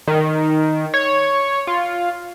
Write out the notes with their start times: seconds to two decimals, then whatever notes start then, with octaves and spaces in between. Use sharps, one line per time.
0.08 D#3
0.94 C#5
1.67 F4